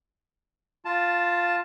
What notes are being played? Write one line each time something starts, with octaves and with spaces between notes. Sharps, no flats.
F4 A5